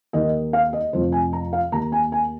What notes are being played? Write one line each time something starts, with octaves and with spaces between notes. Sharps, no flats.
D#2 D#3 D#5
F5
D#5
F1 F2 F3 C5
G#5
A#5
F5
D#2 D#3 A#5
G#5
G#5